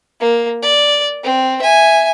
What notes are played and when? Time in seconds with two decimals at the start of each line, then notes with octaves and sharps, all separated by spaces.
0.20 A#3
0.62 D5
1.24 C4
1.62 E5 G#5